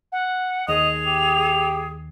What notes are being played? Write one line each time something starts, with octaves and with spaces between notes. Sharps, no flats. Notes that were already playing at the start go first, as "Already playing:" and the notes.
F#5
D#2 G#4 D#5 F7
G4